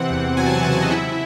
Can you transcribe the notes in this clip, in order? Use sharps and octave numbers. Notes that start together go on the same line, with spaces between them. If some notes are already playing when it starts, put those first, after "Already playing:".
Already playing: C3 E3 C4 F#5
E2
F#3 G#5
A5
G#5
C#3 A5
G#5
D#5
E4 E5